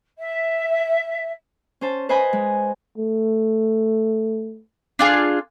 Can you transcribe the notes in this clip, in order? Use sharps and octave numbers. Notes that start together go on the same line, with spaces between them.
E5
C#4 C5 A5
B4 C5 D#5 G#5 B5 C6
G#3
A3
D4 F4 G#4